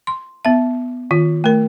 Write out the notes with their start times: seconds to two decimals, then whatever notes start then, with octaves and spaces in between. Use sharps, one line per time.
0.07 C6
0.45 B3 E5
1.11 D#3 F4
1.44 A3 A#4